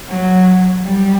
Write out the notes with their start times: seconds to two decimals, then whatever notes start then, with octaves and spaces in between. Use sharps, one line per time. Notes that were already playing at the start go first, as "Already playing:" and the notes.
0.08 F#3
0.85 G3